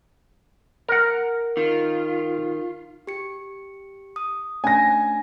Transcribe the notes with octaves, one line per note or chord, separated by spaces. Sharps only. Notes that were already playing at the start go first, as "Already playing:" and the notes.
A#4 F#5
D#3 F4
G4 C#7
D#6
A3 C#4 D4 G#5 A#6